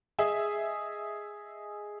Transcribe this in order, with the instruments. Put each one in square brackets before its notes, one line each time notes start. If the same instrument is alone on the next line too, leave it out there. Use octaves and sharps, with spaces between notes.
[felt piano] G#4 D#5 E5 G#5